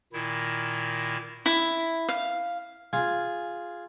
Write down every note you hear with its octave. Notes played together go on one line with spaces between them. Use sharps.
A#2 D#3 E4
E4
F5
F4 G#4 F5 G#5